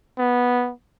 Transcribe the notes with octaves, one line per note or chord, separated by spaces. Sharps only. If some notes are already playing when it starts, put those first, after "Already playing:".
B3